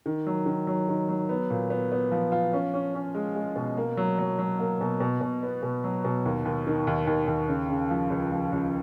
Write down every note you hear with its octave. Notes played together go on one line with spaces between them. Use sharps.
D#3
F#3
D#3
F#3
D#3
F#3
B3
A#2
B3
B3
F3
F4
C#4
C#4
C#4
G#3
G#3
B2
A#3
F#3
F#3
F#3
A#3
B2
B2
B2
B3
B2
F#3
B2
D#2
D#2
D#3
D#2
D#2
D#2
C#3
C#3
F3
C#2
F3
C#2